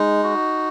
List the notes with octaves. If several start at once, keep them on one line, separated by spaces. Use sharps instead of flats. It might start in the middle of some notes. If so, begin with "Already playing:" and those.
Already playing: G#3 D#4
F#4